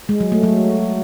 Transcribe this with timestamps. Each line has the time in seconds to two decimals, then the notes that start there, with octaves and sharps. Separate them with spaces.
0.09 G#3
0.20 F#3
0.32 A3
0.43 F#3